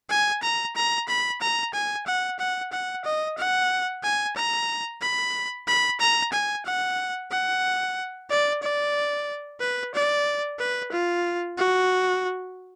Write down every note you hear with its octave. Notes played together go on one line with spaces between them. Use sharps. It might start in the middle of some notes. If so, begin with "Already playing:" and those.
G#5
A#5
A#5
B5
A#5
G#5
F#5
F#5
F#5
D#5
F#5
G#5
A#5
B5
B5
A#5
G#5
F#5
F#5
D5
D5
B4
D5
B4
F4
F#4